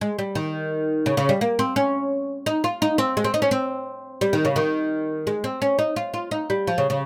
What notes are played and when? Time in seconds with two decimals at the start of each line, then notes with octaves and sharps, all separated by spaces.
0.01 G#3
0.19 G3
0.35 D#3
1.06 C#3
1.17 C#3
1.29 G3
1.41 A#3
1.59 C4
1.76 C#4
2.46 D#4
2.64 F4
2.82 D#4
2.98 C4
3.17 G#3
3.24 C4
3.34 D#4
3.42 C#4
3.51 C4
4.21 G3
4.33 D#3
4.45 C#3
4.56 D#3
5.27 G#3
5.44 C4
5.62 C#4
5.79 D#4
5.96 F4
6.14 F4
6.31 D#4
6.50 G3
6.67 F3
6.78 C#3
6.90 C#3